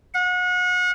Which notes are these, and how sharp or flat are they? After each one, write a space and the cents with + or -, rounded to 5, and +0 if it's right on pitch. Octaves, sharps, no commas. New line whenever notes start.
F#5 -35